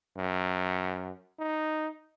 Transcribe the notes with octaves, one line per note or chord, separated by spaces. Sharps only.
F#2
D#4